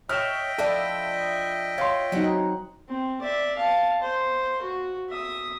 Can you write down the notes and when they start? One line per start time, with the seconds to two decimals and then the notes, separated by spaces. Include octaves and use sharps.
0.09 C#5 D#5 E5 G5 F6 E7
0.58 F3 D4 E4 A4
1.78 F4 C#5 C6
2.12 F#3 C4 D#4 F#5
2.88 C4
3.21 D5 E5
3.56 F5 A5
4.01 C5
4.62 F#4
5.09 E5 D#6